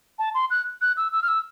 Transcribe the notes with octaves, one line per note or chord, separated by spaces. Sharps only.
A5
C6
F#6
F#6
E6
E6
F6
E6